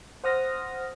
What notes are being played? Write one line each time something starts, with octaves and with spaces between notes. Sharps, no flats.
C5 F#5 D#6 F6 A#6